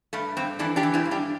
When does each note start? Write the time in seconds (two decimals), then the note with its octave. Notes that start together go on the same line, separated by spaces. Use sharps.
0.13 G2 A3
0.37 G2 C4
0.59 E3 A3 D4
0.76 D4 G4
0.83 E3
0.94 C4 E4
1.06 G2
1.11 D4 G4